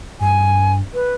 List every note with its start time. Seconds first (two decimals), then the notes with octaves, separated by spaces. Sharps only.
0.20 G2 G#5
0.94 B4